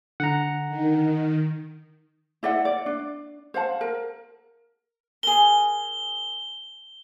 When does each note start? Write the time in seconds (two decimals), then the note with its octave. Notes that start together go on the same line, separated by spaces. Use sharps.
0.20 D3 F#5 A#5
0.68 D#3
2.43 E4 D5 E5 F#5
2.65 D5
2.86 D4
3.54 C5 F5 F#5 A5
3.81 A#4
5.23 G#4 A#4 G7